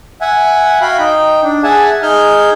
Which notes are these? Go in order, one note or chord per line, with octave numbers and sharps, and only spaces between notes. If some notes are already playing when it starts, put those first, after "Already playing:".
E5 F#5 G#5
F#4 F5 G5 B5
D#4 G5
D4
G#4 E5 F#5 G#5 A5
D#4 G#4 F6 G6